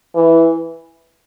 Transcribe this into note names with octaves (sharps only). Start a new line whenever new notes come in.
E3